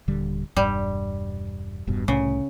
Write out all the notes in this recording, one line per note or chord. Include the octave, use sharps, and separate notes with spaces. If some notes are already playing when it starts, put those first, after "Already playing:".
D#1 D3 G3
E1 G2 G3
E1 G2 B2
C2 A2 C#3 A3